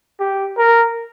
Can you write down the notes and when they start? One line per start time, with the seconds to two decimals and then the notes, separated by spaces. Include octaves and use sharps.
0.20 G4
0.57 A#4